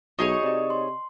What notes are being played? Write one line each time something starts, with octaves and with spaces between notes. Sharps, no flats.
B1 D#4 F#4 G#4 C#5 D#5 C#6
C3 D5 D#5
C6